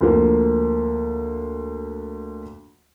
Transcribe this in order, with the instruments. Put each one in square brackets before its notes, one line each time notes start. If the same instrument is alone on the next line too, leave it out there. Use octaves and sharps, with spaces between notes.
[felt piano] D2 F3 A#3